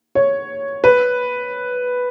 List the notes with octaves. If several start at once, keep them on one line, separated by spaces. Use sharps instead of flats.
C#5
B4